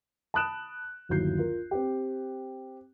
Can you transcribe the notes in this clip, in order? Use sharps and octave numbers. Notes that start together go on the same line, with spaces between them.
A5 B5 D#6 F#6 D7 E7
G1 D#2 F#3 E4 G6 C7
F4 A#4
C4 G4